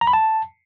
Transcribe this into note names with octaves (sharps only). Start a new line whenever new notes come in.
A#5
B5
A5